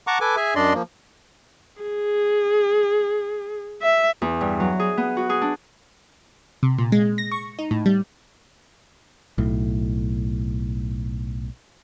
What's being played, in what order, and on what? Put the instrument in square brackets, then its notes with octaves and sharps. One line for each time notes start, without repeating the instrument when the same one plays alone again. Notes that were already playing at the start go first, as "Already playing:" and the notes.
[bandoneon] F#5 A5 A#5 C#6 D6
A4 B4 G#5 D6
G#4 E5 G#5
F#2 D4 D5 D#5 C6
F3 A#3
[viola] G#4
E5
[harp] E2
G2
F#3
G#4
B3
F#4
G#4
D4
[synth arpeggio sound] C3
A#2
G#3
A#6
C#6
D#4
A2
G3
[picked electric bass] B1 A2